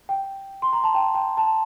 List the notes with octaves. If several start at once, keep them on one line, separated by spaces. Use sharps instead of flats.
G5
C6
A#5
A5
G5
G5
A5